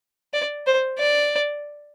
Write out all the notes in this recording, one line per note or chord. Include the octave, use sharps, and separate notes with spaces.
D5
C5
D5